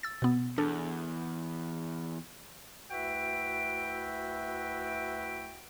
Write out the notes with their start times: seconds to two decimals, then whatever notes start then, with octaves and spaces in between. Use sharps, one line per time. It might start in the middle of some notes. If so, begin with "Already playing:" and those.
0.03 E6 A6
0.22 B2 B3
0.58 E2 D4 A4
2.90 D2 E4 F#4 B4 E5 G5